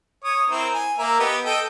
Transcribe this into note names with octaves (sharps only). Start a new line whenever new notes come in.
C#5 D#6
C4 E4 A#4
G#5
A#3 A#4 E5
B3 G4 D#5
A4 D#5 G5